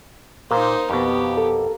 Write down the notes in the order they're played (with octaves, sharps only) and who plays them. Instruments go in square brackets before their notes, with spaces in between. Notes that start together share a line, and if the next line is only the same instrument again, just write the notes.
[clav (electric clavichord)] A#2 [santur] A#3 [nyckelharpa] D#4 C5
[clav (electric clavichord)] F2 B2 [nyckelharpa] B3 G4
[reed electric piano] A4